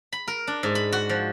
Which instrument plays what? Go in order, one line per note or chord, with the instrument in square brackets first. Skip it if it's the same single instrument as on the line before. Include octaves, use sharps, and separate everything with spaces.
[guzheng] B5
A#4
D4
G#2
B5
F#4
F3